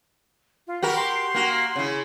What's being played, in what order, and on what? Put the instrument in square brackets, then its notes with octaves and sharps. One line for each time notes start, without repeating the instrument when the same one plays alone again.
[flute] F4
[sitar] F#4 G4 A#4 [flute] B5
[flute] C6
[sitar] A#3 F#4
C#3 E4